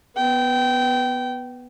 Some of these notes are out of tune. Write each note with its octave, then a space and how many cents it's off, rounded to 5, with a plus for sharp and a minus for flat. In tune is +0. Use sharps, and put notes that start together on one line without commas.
B3 +0 G5 -20